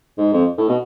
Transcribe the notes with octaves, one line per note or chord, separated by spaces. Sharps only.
G#2
F2
A2
B2